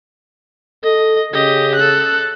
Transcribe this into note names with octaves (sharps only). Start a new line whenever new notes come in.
A4 D#5
C#3 G4 D#5
A4 F#6